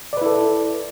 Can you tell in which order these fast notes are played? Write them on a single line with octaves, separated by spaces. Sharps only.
D5 B4 E4 A4